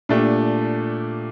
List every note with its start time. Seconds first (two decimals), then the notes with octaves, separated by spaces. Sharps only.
0.09 A#2 A3 D4 G4